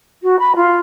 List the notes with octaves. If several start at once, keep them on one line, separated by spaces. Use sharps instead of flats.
F#4
B5
F4